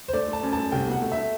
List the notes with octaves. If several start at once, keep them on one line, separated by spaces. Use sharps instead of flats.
C5
A3 D5
A3
A5
F#2
A3 A5
C2 G5
B2 F#5
A3
E5
A3